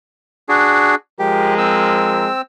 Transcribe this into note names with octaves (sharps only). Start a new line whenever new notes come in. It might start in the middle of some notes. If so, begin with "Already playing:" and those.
D4 F#4 G#4
F3 G#3 G4 A#4
C4 E6